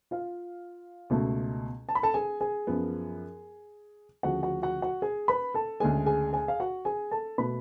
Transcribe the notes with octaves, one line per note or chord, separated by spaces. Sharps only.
F4 F5
C#2 B2 A3
A5
B5
A4 A5
G#4 G#5
G#4 G#5
F#2 F3 B3
D2 C#3 F3 F#4 F#5
F#4 F#5
F#4 F#5
F#4 F#5
G#4 G#5
B4 B5
A4 A5
D2 C#3 G#3 G#4 G#5
G#4 G#5
G#4 G#5
F5
F#4 F#5
G#4 G#5
A4 A5
B2 A3 B4 B5